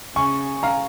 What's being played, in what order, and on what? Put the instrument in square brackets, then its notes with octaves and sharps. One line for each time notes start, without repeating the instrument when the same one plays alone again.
[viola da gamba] C#3 [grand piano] G#5 C#6
[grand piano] F5 A#5